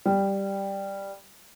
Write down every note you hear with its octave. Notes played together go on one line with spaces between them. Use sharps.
G3